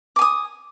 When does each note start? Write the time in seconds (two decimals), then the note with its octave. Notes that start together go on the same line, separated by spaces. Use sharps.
0.16 D6
0.19 G#5
0.22 D#6